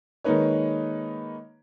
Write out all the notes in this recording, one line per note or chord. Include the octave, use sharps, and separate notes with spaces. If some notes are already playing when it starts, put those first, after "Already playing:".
D#3 G#3 A#3 D#4 B4 C#5